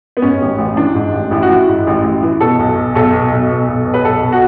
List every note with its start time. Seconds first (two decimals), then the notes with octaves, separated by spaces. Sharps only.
0.17 B3
0.22 G#2 C#4
0.41 A1
0.58 A1
0.77 E3 D4
0.95 G#2
1.13 A1
1.31 A1 E4
1.43 F#4
1.49 E3 E4
1.68 G#2
1.87 A1
2.05 A1
2.23 E3
2.40 B2 A4
2.59 B1
2.77 B2
2.95 B1 A4
3.14 B2
3.32 B1
3.51 B2
3.68 B1
3.86 B2
3.94 B4
4.04 B1 A4
4.22 B2
4.32 F#4